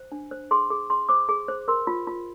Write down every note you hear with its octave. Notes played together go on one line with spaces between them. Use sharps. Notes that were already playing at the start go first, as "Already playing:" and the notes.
Already playing: C5
D4
C5
G#4 C6
G#4
G#4 C6
C5 D6
G#4
C5
A#4 C6
F4
F4